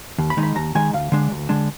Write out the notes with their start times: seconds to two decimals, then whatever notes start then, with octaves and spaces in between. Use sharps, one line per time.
0.18 D#2
0.30 B5
0.37 D#3 G#3 D#4
0.43 B5
0.55 D#2 A#5
0.75 D#3 G#3 D#4 G#5
0.93 D2 F5
1.12 D3 G#3 D4
1.31 D2
1.49 D3 G#3 D4